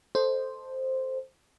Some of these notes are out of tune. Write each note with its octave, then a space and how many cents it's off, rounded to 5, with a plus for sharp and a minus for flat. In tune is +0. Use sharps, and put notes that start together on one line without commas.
A4 +0 C5 +0 D#5 -20